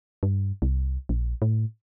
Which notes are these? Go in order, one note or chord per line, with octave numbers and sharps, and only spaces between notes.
G2
C2
A#1
A2